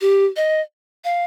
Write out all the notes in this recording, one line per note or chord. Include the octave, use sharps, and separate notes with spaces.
G4
D#5
F5